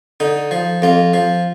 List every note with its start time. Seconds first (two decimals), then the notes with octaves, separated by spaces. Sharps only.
0.20 D3 D#4
0.51 F3
0.82 F2 F4
1.14 F3